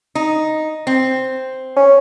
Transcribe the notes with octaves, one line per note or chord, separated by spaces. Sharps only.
D#4
C4
C#4